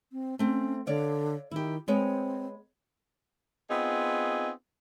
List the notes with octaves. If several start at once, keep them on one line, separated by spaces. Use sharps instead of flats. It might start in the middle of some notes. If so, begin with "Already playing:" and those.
C4
A3 C4 C#4
D3 C#5 D5 F5
D#3 E4 G4
G#3 B3 C4 C#5
B3 C4 D#4 F4 G#4